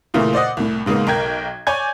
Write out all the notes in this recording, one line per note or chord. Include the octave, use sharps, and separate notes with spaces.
A#2 C#3 E3 A3 A#3
C5 D5 D#5 F#5
C2 A2
G#2 C#3 G#3 A#3 B3
B1 A#4 G5 G#6
C#5 D5 G#5 G6 G#6